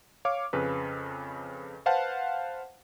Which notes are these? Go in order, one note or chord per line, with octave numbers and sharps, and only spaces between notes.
C#5 F5 D6
F2 C#3 B4
B4 C5 F5 F#5 A5